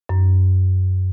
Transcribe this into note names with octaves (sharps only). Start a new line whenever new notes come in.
F#2